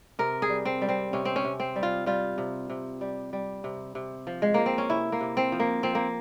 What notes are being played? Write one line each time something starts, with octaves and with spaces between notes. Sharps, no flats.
C3 A#4
G#4
G3
C4
G3
C4
C3 C#4
C4
C#4
C3
C4
G3
F4
G3 F4
C3
C3
G3
G3
C3
C3
F3
G#3
F3 A#3
C4
C#4
C3 E4
A#3
C3
C4
F3
A#3
F3 C4
A#3